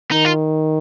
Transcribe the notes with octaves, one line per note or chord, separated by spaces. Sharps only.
D#3 D#4
F4